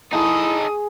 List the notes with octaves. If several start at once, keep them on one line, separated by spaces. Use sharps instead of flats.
D#4 E4 G#4 A4 C#6 D#6